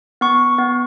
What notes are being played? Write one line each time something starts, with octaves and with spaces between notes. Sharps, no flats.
B3 C#6
B3